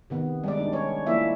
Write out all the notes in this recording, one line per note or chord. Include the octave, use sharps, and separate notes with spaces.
C3 D#3 B3
G3 G#3 D5
D4 D#4
C#4 C#5
F3 A#3 E4 D5 E5